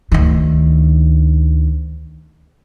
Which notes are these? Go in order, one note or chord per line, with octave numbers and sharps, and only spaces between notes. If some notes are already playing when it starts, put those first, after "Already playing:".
D2 D#3